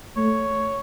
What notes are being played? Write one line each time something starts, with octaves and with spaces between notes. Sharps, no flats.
A3 C#5